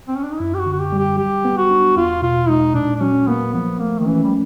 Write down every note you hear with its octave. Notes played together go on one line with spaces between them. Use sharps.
C4
C#4
D4
D#4
F#2 E4
G4
F#4
D3
F#4
G4
G3
G4
F#3 G4
B3
F#4
D4
E2 F4
B2 F4
G#3 D#4
A#2 D4
D4
F#3 C#4
A#3 B3
F3 B3
A3 A#3
D#3
E3 C#4
G3